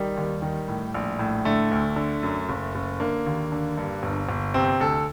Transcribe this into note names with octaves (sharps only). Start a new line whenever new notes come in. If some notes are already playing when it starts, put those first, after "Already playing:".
Already playing: D#3 G3
D#2
D#3
A2
A#1
A2
D3 A3
D2
D3
F#2
F#1
F#1
D3 A#3
D#2
D3
G2
G1
G1
C3 C4
D2 A4